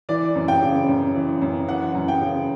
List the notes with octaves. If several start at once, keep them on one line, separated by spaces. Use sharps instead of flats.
E3 D5
F#2
G5
C#3
F#2
E3
F#2
E3 F#5
F#2
G5
C#3